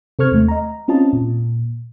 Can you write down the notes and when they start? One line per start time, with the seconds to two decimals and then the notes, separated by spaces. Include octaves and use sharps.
0.19 C3 A4 C5 C#6 F6 G#6
0.32 D#2 A3
0.48 D#5 A#5
0.88 C4 C#4 F4 D#5 A5
1.13 A#2